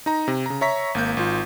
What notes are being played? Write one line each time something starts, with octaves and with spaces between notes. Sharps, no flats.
D#4 A#5
C3
C#3 A#5
C#5 E5 A#5 C#6 B6
G#1 A#3 G6
G#1 F4